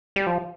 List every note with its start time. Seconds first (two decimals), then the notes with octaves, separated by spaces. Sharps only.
0.16 G3
0.27 F3